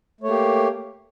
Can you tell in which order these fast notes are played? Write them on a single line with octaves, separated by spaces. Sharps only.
A3 C#5 A#3 G4